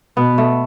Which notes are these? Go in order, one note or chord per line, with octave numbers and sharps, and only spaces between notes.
B2 B3
A3